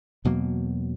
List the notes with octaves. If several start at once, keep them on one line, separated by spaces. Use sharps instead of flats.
E2 B2 F#3 A#3